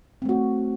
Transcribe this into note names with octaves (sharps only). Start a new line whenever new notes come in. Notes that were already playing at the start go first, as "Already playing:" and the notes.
A3 C4 F#4